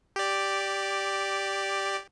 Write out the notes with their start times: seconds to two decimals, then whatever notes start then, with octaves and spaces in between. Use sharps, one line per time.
0.16 G4 D5